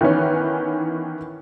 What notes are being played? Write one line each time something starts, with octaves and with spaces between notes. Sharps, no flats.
D#3 E3 B3 C#4